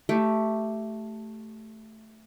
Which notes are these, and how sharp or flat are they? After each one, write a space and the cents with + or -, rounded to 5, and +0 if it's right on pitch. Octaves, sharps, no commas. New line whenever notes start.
A3 +0 G4 -10